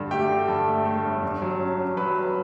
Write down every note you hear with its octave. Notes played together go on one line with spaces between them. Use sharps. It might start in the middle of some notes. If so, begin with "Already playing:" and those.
Already playing: G2 D3
A3 G4 G5
D3
G2 A4 A5
A3
A3
G1
G2
F#3
C#4
C#4
F#3 B4 B5
F#3